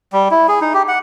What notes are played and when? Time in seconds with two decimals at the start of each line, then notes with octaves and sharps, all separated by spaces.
0.13 G3
0.31 E4
0.48 G#4
0.61 D#4
0.74 G4
0.88 F#5